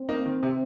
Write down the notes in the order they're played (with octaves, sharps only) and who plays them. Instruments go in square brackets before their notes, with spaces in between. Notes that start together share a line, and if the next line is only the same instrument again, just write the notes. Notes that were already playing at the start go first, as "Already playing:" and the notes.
Already playing: [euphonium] C4
[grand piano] A#3 D#4
D#3
C3